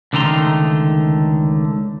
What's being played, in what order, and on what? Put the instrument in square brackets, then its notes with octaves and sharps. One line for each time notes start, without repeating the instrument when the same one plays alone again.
[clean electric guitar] C#2 D3 D#3 A3 A#5 C6